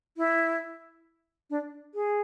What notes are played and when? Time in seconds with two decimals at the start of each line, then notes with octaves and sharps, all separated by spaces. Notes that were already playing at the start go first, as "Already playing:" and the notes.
0.17 E4
1.50 D4
1.95 G#4